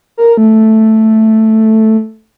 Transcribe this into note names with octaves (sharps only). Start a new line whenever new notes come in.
A#4
A3